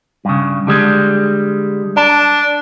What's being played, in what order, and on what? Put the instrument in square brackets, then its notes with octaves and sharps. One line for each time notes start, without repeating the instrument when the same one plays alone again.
[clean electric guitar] G2 C#3
D3 G3 G#3
[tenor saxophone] D4 [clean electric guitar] A5